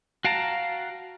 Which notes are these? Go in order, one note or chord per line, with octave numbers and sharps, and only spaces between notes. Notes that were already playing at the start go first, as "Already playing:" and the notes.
F#4 F5 G5 A5 A#5